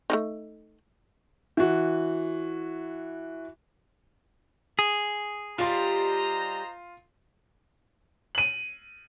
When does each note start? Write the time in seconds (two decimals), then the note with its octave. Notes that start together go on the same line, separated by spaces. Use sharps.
0.10 A3 D4 D#4
1.57 E3 F#4
4.79 G#4
5.58 G3 F4 G4 C5 D#5 A#5 C6
8.35 D#7 F#7